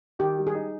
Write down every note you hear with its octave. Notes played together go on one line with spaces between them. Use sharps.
D#3 G4
G3
G#4
D#4